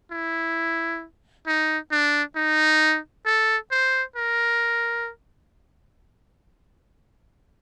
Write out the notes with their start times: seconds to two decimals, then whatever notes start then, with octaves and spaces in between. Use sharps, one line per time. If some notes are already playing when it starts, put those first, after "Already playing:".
0.11 E4
1.47 D#4
1.92 D4
2.36 D#4
3.26 A4
3.71 C5
4.16 A#4